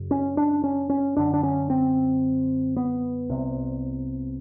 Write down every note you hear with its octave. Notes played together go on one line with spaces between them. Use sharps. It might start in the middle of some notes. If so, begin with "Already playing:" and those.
Already playing: F#2 C#3
C#4
D4
C#4
C#4
F#2 D3 D4
D4
C#4
C4
B3
C2 C3